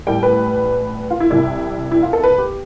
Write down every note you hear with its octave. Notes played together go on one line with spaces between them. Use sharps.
A1 A2 G3 G5
B4
F4
E4
C2 C3 G3 E4
E4
F4
A4
B4
G4